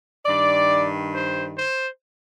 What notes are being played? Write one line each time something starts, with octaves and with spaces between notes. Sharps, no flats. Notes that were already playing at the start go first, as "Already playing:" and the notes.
G2 D#3 D5
C5
C5